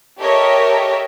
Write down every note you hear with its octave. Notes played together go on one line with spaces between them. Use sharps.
G4 A4 A#4 C#5 D#5 E5